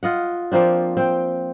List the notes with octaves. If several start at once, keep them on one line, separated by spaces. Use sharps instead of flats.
F4 D#5 F#5
F3 A#3 C4 D4
C4 G5